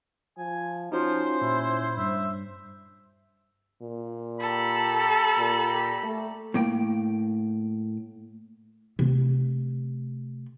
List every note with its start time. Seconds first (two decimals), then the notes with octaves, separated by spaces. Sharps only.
0.38 F3 G#5
0.92 F3 C#4 D#4 F4 F#4 C5
1.41 A#2 E4
1.97 G2 G3 E5
3.82 A#2
4.41 G4 A4 A#5 B5
5.38 A#2
6.03 A3
6.54 A2 A#3 G5
8.99 C3 A3